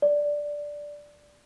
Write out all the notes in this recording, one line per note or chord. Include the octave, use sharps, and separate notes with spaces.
D5